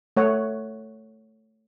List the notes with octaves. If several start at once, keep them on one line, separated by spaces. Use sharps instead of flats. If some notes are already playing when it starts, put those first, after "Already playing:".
A3 C#5 F#5